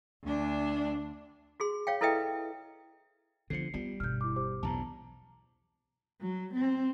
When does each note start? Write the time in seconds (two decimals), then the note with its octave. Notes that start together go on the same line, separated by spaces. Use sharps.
0.24 D2 D4
1.60 F#4 G#4 C6
1.87 C#5 F5 G5
2.01 E4 A4 B4 D#5 E5 G5
3.50 D3 F3 B3 D4 C7 C#7
3.74 G3 B3 F4
4.00 G1 B2 F6 G6
4.21 E4 D6
4.36 G4 C5 D6
4.63 B1 E2 G2 A5 A#5
6.21 F#3
6.54 C4